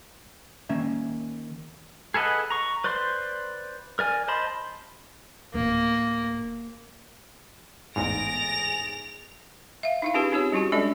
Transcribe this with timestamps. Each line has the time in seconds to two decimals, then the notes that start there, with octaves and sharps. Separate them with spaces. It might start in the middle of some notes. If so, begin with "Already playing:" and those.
0.69 D#3 A#3 C#4 E5
2.14 G#4 A4 B4 D#5 F#5
2.50 A#5 C#6
2.84 B4 C5 D5 C6
3.99 A#4 D5 G#5
4.28 C5 D#5 A5 B5 C6
5.54 D1 A#3 B3
7.96 A1 E2 G#2 G#4 A6 A#6 D7 F7
9.83 E5 F5
10.02 D#4 E4 F5
10.14 C#4 D#4 F4 G4 G#4 B4
10.32 C4 D#4 G4 G#4 C#5
10.52 G3 C#4 E4 F#4 G4
10.72 G#3 C#4 D4 A4 D5 D#5